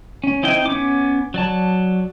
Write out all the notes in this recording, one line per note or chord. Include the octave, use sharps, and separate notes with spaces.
C#4
C4 D#4 E4 G5
B3 C#4 D6
F#3 D5 A5